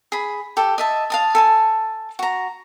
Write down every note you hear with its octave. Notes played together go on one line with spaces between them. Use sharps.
G#4 B5
G4 A4
D#5 E5 A5
F5 A5 D#6
A4 G#5 A5
F#4 A#5